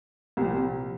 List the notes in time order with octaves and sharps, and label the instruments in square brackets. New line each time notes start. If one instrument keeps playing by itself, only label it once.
[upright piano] C2 A#2 F3 G4